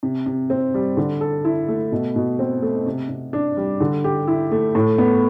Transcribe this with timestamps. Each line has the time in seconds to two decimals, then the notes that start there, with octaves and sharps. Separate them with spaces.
0.03 C3
0.26 C3
0.50 C4
0.74 G3
0.97 D3
1.21 A4
1.45 E4
1.68 A3
1.92 B2
2.16 B2
2.39 C4
2.62 A3
2.86 C3
3.09 C3
3.33 D4
3.57 G3
3.81 D3
4.04 G4
4.28 E4
4.51 A3
4.75 A2
4.98 B3